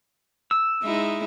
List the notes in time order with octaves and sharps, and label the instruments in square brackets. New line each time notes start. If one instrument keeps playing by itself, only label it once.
[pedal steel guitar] E6
[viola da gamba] G#3 D#4 E4